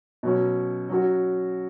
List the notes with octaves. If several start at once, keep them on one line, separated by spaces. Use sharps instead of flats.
B2 F#3 C#4
F#3 C#4 F#4